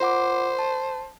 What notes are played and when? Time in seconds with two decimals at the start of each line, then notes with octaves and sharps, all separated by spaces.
0.01 F4 C5 F#5 D6
0.59 A5